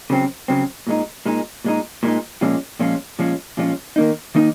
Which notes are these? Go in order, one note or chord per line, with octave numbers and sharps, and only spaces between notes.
C#3 F#3 C4
C#3 F#3 C4
A#2 G#3 D#4
A#2 G#3 D#4
A#2 G#3 D#4
A#2 G#3 D#4
A#2 F3 G#3 C#4 F4
A#2 F3 G#3 C#4 F4
A#2 F3 G#3 C#4 F4
A#2 F3 G#3 C#4 F4
D#3 A#3 D#4
D#3 A#3 D#4